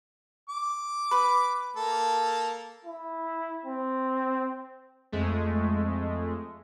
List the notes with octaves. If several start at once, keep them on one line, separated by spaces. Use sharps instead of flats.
D6
B4
A#3 A4
E4
C4
F2 G#3 A3